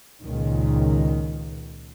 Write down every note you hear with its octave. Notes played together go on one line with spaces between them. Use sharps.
C#2 A#2 D#3